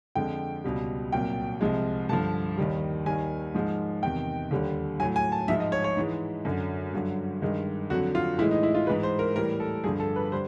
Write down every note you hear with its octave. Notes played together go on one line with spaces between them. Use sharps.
F2 D3 F3 G#3 G5
C#2 B2 G3
C2 A#2 F#3 G5
C2 C3 F3 G#3
G2 D3 F3 A5
D#2 D#3 G3
D#2 D#3 G3 G#5
G#2 F3 G#3
E2 C3 D#3 G5
D#2 D3 G3
A2 F#3 G#5
G#5
A5
G#2 F3 G#3 E5
D#5
C#5
C#5
G#2 E3 G#3
F#2 D3 F#3
G2 D3 F#3
G2 D#3 G#3
F2 D3 F#3 F#4
F4
A2 E3 G#3 E4
D#4
E4
F4
G#2 E3 G#3 B4
C5
A#4
A2 E3 G3 A#4
A4
G2 D3 F3 G#4
A4
B4
D3 G3 C5